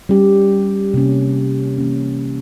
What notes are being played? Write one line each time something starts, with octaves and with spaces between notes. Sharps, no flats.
G3 C#4 G4
C3 G3 A#3 C#4
E3 A#3 C#4